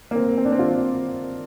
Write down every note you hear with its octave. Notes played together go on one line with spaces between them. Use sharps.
A#3
C4
C4
D4
C4
F4